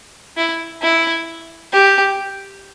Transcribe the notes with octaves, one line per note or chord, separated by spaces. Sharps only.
E4
E4
G4